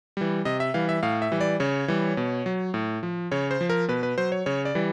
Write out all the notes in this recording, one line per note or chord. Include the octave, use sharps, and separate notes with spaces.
E3 G3
C3 D#5
E5
E3 G3 F5
E5
A2 F5
E5
E3 G3
D5
C#3 C#5
E3 G3
B2
F#3
A2
F3
C#3 C#5
C5
F3
A#4
B2 B4
B4
F#3 C5
C#5
C#3 C#5
D5
E3 G3